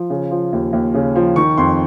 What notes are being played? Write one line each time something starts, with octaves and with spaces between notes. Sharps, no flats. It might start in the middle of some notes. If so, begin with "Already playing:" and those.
Already playing: F3
C#3
F3
D#2
D#2
C#3
F3
D#3 C#6
F2 C6